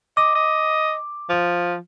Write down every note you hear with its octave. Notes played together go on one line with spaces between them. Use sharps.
D#5 D6
D#5
F3